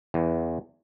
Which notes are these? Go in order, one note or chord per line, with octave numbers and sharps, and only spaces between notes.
E2